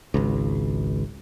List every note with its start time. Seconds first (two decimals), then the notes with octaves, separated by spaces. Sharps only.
0.14 G#1 C#2